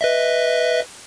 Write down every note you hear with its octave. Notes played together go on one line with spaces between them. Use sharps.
B4 D#5 E5